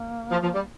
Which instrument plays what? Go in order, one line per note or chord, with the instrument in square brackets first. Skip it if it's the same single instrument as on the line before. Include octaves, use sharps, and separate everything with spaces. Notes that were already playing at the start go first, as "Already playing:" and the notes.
Already playing: [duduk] A#3
[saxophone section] F3
F3
G3